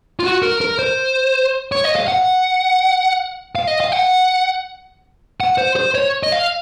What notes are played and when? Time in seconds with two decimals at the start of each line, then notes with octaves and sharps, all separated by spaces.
0.20 F4
0.24 F#4
0.43 A#4
0.61 A#4
0.79 C5
1.72 C#5
1.84 D#5
1.96 F5
2.08 F#5
3.55 F5
3.67 D#5
3.80 F5
3.92 F#5
5.40 F#5
5.58 C5
5.76 C5
5.95 C#5
6.23 D#5
6.32 F5